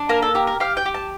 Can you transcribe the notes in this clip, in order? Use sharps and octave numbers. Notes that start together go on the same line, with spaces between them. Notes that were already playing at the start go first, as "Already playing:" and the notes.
Already playing: D4
A#3 A#4
A4
G4 A#4
A#4
G4 F5
G5
G4
A5